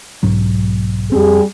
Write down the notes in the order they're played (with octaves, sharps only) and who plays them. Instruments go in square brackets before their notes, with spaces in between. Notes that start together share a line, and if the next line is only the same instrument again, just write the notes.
[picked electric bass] B1 G#2 F#3
[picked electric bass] F2 A#3 C4 [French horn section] G3 G4 G#4